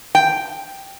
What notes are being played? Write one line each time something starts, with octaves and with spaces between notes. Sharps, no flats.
G5